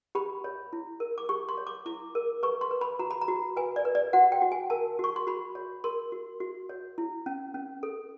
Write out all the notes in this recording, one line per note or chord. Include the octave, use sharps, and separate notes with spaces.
G4 B5
C#5
E4
A#4
D6
G4 C#6
C6
C#5
D6
E4 D6
A#4
B4 C#6
C6
B4
B5
F#4 A#5
B5
A#5
F#4
B4 G#5
D5
B4
D5
F#4 F#5
G5
F#4
G#5
A#4 A5
F#4 C#6
C6
F#4 B5
C#5
A#4 C6
F#4
F#4
C#5
E4
C#4
C#4
A4